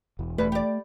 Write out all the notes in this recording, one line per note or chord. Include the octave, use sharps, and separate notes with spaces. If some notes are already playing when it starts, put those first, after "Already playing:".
E1 E2 E3
F#2 G3 A3 B4
G4 D5